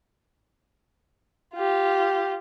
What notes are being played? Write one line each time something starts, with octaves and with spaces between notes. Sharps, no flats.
F4 G4